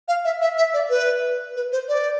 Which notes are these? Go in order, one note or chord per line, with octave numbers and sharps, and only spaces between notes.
F5
E5
E5
E5
D5
B4
B4
C5
D5